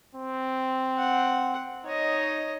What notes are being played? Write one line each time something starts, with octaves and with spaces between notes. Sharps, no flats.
C4
F#5
D#4 C#5 D#5